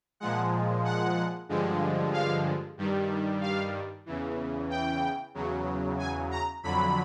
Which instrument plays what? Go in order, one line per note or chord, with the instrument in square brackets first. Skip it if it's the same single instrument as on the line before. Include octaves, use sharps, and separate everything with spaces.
[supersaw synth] A#2 F3 G#3 F#5
F#5
G2 D3 F3 G#3
F5
G2 D#3 G3
F5
E2 C#3 E3
G5
E2 C#3 F#3
G#5
A#5
F2 D3 F#3 B5